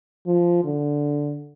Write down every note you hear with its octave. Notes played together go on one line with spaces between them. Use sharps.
F3
D3